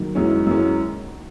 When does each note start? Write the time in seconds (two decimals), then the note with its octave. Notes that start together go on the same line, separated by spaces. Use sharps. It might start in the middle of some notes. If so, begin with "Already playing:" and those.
Already playing: D#3 F#3
0.15 F#2 E3 G#3 C#4
0.47 F#2 E3 G#3 C#4